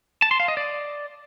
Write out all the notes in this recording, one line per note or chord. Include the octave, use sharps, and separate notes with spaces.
A5
C6
F5
D#5
D5